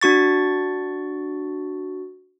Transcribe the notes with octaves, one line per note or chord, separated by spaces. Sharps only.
D4 F#4 C#6 A6